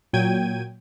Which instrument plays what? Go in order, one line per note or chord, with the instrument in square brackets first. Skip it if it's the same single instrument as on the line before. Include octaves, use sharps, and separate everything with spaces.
[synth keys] A#2 F#3 G5 G#6 D#7